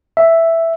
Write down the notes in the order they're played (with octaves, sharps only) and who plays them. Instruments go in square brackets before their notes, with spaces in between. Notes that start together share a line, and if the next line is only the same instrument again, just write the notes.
[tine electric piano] E5